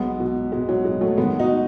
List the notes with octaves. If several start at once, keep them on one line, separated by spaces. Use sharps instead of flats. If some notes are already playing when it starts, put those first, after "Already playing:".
Already playing: B1 G#3 B3
B2
B2 G#3
F#3
B2 G#3
F#3 A3
D#3 G#3 B3
D#4 F#4